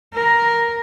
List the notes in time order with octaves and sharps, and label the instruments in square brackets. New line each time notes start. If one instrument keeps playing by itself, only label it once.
[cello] A#4